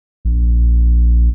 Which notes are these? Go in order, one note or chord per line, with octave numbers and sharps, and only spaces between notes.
A#1